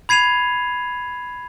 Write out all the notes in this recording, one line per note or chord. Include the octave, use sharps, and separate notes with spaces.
B5 G#6 C7 D#7 F7